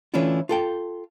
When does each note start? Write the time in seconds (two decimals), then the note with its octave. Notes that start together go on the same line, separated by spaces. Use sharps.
0.14 E3 A3 C#4 D4 E4 F4
0.49 F4 A4 G5